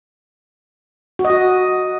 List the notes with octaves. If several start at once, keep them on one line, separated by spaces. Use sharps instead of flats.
F#4
D#5
F#4